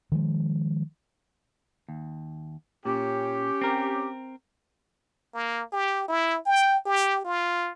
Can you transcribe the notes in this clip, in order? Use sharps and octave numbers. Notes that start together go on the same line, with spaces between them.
D#3 F3 G#3
D#2
A#2 C#4 G4
C4 A#4
A#3
G4
E4
G5
G4
F4